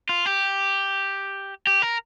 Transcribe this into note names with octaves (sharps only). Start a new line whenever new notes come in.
F4
G4
G4
A#4